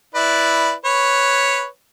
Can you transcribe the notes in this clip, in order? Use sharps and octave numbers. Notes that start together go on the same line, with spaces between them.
E4 B4 D5
B4 C#5